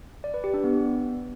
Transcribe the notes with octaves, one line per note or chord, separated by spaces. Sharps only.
D5
B4
G4
D4
B3